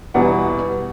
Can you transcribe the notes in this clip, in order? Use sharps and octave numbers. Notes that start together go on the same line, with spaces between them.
E2 B2 G3 F#5